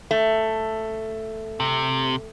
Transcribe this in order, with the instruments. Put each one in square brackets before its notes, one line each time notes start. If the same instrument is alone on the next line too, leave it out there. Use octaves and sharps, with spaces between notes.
[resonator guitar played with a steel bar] A3
[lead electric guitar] C3